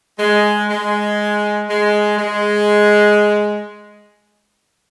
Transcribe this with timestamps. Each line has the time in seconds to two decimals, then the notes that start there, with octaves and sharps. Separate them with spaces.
0.19 G#3
0.69 G#3
1.69 G#3
2.18 G#3